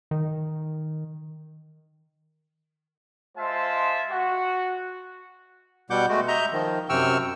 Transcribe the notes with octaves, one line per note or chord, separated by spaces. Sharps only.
D#3
G#3 F4 C5 E5 A5
F#4
B2 G3 F#5 D6 G6
G#3 A3 F#4
D#5 E5 A#5 G6
D#3 F3
F#2 C3 G5 C#6 E6 F6